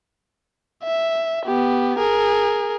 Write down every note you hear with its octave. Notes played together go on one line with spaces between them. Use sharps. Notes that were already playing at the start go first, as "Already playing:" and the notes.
E5
B3 G4
G#4 A#4